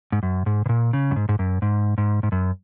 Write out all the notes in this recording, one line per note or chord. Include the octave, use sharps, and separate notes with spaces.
G#2
F#2
G#2
B2
A#2
C#3
F#2
G#2
G#2
F#2
G#2
G#2
G#2
F#2